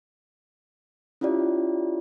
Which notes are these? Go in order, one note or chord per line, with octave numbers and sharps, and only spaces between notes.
C#4 E4 F4 G4 D5